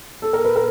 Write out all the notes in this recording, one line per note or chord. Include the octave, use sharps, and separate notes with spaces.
A4
A#4
B4
A#4